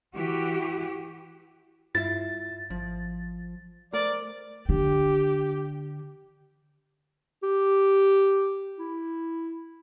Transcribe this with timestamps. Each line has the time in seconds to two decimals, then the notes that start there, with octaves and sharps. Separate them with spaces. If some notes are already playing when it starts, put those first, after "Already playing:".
0.13 E3 F#4 G4
1.95 G2 E4 F4 E5 A6
2.70 G#1 F3
3.93 A3 A#4 C5 D5
4.69 D3 G4
7.44 G4
8.79 E4